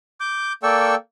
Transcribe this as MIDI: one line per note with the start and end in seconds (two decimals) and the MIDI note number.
0.20 0.53 86
0.20 0.53 91
0.63 0.95 58
0.63 0.95 69
0.63 0.95 74
0.63 0.95 79
0.63 0.95 85
0.63 0.95 88